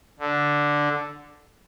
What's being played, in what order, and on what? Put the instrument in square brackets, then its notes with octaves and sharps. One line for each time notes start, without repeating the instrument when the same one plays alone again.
[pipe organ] D3